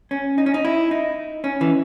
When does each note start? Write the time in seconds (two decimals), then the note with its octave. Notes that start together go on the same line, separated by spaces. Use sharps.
0.11 C#4
0.38 D#4
0.46 C#4
0.54 D#4
0.65 E4
0.91 D#4
1.44 C#4
1.61 E3